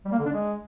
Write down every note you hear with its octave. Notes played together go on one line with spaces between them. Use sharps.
G3
A#3
D3
D4
G#3